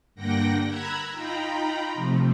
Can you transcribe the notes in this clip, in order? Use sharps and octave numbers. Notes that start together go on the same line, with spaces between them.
G2 D3 A#3 F#5 G5 A#6
A#5 B5 E6 F#6 G#6
D#4 F4 G5 A#5 B5
C3 F3 A3